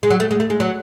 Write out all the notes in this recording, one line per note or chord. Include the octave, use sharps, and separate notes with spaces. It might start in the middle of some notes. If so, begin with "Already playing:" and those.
G#3
F#3
A3
G#3
A3
G#3
F#3